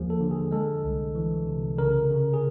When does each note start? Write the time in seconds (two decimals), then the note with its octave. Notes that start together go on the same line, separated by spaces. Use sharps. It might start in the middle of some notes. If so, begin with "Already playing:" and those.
Already playing: D#2 F3 A#3 G#4
0.10 A4
0.21 D3
0.31 G#4
0.51 G#3 A4
0.84 C2
1.15 E3
1.47 C3
1.78 C#3 A#4
2.10 C#3
2.34 G#4